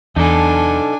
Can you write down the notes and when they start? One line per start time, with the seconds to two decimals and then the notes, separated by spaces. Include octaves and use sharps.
0.16 E2 D4 D#4 A4 G#5